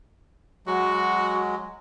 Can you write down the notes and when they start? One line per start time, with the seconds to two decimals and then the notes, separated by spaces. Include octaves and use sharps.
0.67 F#3 G#3 F#4